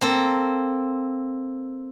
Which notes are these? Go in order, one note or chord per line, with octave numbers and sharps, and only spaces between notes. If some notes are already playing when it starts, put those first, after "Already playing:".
A#3 C4 A4